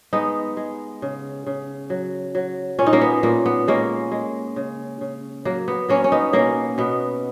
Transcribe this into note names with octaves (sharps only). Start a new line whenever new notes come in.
G#3 B3 D#4
G#3
C#3
C#3
F#3
F#3
A#2 C#4
D#4
A#3 C#4
B3
A#2 A#3
B3
G#3 A#3 C#4
G#3
C#3
C#3
F#3 A#3
B3
F#3 A#3 C#4
C#4
B3 D#4
B2 A#3 C#4
B2 B3